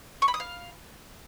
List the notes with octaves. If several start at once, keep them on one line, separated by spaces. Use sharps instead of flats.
C#6
B5
D#6
F5